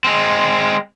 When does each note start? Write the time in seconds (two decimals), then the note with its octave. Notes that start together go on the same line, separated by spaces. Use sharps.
0.05 G#3 C4